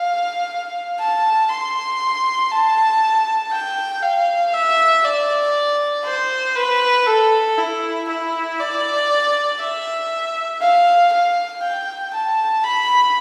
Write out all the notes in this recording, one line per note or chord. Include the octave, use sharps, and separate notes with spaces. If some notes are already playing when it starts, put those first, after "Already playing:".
Already playing: F5
A5
C6
A5
G5
F5
E5
D5
C5
B4
A4
E4
E4
D5
E5
F5
F5
G5
A5
B5